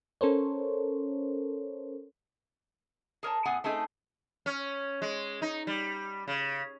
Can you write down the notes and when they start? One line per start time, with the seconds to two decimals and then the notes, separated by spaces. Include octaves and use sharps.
0.21 C#4 A4 A#4 C5 C#5
3.23 G#4 A#4 C#5 A5
3.45 A2 B3 G#4 F#5 G#5
3.64 A3 C4 D#4 G#4
4.46 C#4
5.02 G#3
5.42 D#4
5.67 G3
6.28 C#3